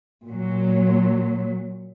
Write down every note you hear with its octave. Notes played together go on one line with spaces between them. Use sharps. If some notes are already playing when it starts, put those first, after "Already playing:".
A#2 F#3